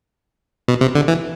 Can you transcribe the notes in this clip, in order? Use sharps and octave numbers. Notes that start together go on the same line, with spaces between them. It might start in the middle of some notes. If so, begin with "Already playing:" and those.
B2
C3
D3
E3